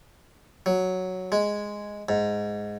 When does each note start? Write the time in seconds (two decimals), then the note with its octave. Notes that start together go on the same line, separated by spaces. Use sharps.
0.66 F#3
1.32 G#3
2.09 G#2